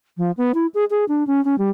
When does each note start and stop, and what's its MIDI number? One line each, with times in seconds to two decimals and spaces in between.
0.17 0.31 53
0.37 0.52 59
0.54 0.67 64
0.74 0.84 68
0.90 1.05 68
1.08 1.26 62
1.27 1.43 61
1.45 1.56 61
1.58 1.70 55